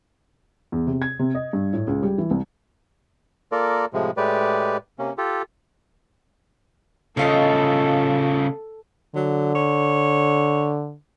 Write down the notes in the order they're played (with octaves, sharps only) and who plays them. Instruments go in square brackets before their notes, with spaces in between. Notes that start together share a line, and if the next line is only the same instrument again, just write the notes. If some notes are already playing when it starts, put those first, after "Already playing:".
[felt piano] E2
C3
G#6
C3
D#5
G2
A2
C#2
G3
E3
C2
[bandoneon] A#3 F4 A4 A#4 D5
A2 C3 F3 G#3
A2 G#3 G4 B4 D5
C3 A#3 C#4
F4 G4 A4
[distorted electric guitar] C#3 A3 [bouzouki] C#4 F4 D#5 [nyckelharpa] A4
[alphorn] D3 [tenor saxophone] F#3
[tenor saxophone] C#5